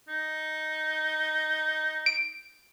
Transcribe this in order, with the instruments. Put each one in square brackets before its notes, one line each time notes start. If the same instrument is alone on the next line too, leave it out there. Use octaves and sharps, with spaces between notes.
[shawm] D#4
[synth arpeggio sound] D7